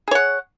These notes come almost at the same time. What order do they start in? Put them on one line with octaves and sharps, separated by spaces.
G#4 C#5 F#5